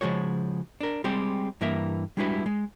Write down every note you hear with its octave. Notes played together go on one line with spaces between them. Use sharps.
C#3 F3 G#3 F#4 C#5
D4 A#4
G3 G#3 C4 G4
G2 E3 A#3 A#4 E5
G3 G#3 D4 E4 F#4 B4
G#3